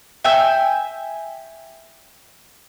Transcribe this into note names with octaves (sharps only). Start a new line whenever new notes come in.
E5 G5 G#5 E6